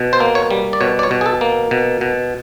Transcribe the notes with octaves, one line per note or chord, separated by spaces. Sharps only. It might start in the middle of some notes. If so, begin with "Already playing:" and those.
Already playing: B2
C5
A#3
C#5
G3
D5
B2 C#5
D5
C#5
B2
G#4
A4
A#3
B2
B2